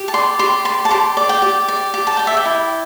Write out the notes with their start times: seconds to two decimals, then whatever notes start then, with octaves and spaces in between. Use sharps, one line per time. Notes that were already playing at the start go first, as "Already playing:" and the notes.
Already playing: G4
0.08 A5
0.14 D5 C6
0.39 G4 C6
0.65 D5 C6
0.85 A5
0.91 G4 C6
1.17 D5
1.29 G5
1.42 G4
1.68 D5
1.94 G4
2.07 A5
2.17 D5 G5
2.27 E5
2.37 G5
2.45 E4